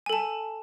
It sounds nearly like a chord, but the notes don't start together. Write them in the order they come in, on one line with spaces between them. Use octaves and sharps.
G#5 A4 A5